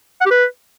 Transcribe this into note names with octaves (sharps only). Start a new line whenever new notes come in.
F#5
G4
B4